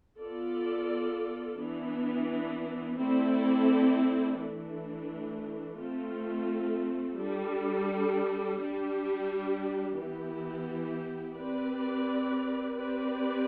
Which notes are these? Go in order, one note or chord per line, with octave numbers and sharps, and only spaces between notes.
B3 F4 A4 D5
E3 B3 D4
A3 C4 E4 A4 D5
E3 A3 D4
A3 C4 F4 A4
G3 D4 A4
G3 D4 G4
E3 B3 E4 G4
C4 G4 B4 D5
C4 G4 B4 D5